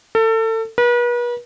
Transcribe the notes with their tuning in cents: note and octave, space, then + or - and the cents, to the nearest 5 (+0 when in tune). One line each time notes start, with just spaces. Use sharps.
A4 +30
B4 -40